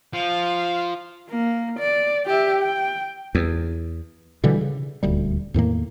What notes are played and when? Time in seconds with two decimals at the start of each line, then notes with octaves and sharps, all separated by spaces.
0.13 F3 F5
1.29 A#3
1.79 D5
2.26 G4 E5
2.60 G5
3.35 E2
4.44 B2 D3 E3 G3
4.61 C#3
5.03 D#1 D2 G3
5.54 E2 A2 D#3 A#3